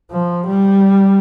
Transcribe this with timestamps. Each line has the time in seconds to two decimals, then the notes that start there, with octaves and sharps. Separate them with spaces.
0.11 F3
0.47 G3